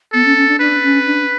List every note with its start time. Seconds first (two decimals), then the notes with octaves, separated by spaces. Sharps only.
0.13 B3 A4
0.25 C#4
0.36 C#4
0.48 D4
0.59 D4 B4
0.83 C#4
1.06 D4